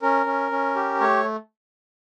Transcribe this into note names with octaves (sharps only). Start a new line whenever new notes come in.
C#4 A#4
C#4
C#4
G4
A3 C#5